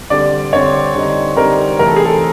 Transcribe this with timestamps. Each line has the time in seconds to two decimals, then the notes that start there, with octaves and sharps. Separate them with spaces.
0.10 D3 G3 C4 D5
0.53 D3 G3 C4 C#5
0.94 D3 G3 C4 D#4
1.36 D3 G3 C4 D#4 A#4
1.79 C3 E3 A3 C4 A#4
1.88 A4
1.96 G#4
2.05 A4